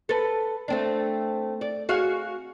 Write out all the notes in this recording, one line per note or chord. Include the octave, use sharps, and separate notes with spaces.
A4 B4
A3 C4 D4
D5
F#4 G#4 F5